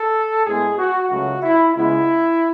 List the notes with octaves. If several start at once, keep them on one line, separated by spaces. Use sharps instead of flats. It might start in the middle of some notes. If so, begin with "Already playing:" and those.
Already playing: A4
A2 G#3 B3 G#4
F#4
C#2 C#3 F#3 A3 F#4
E4
C#2 C#3 G#3 B3 E4